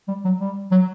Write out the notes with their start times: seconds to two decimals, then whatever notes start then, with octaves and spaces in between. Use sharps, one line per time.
0.08 G3
0.25 F#3
0.40 G3
0.71 F#3